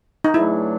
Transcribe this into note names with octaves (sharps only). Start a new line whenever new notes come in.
D#4
E2 C#3 F#3 A3 D4 E4